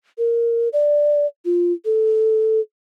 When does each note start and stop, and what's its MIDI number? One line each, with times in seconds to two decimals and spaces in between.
0.18 0.69 70
0.73 1.26 74
1.45 1.72 65
1.85 2.60 69